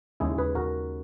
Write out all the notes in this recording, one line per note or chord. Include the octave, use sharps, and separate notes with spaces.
D#2 C#3 G#3 E4 G#4
G#4 B4
F#4 A#4